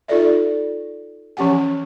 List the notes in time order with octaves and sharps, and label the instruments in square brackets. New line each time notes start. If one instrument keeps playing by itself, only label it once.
[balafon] D#4 F4 A4 D5 E5
E3 F3 C#4 G4 F#5 G#5